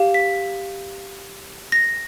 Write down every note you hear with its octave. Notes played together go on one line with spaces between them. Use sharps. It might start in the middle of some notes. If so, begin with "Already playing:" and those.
Already playing: G4 F5
B6
A#6